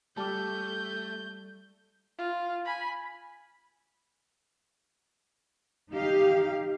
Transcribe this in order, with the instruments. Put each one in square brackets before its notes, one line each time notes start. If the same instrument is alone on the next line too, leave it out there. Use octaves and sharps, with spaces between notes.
[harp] G3 F6 [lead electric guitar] A3 [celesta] A5 D6 [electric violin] G6
[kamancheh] F4
G#5 B5
[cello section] D#4 G4 F5